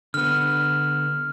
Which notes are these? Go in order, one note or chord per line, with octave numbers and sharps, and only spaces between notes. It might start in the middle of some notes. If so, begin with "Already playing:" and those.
D3 B3 F6